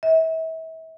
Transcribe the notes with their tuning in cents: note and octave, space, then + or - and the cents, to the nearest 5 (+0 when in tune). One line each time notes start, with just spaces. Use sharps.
E5 -35